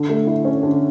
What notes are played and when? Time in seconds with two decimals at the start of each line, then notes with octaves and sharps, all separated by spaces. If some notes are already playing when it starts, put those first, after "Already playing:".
Already playing: D3
0.09 A3
0.27 E4
0.45 C#4
0.63 D3